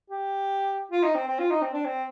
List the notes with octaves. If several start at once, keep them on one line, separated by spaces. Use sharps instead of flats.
G4
F4
D#4
C4
C4
F4
D#4
C4
D4
C4